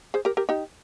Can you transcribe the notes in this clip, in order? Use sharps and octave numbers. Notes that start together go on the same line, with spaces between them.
G#4 C5
G4 A#4
G4 A#4
D#4 G4